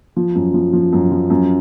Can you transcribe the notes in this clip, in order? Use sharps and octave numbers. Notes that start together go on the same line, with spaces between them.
F3
F#2
F3
F3
F#2
F3
F#2